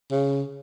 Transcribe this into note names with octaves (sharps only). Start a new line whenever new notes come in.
C#3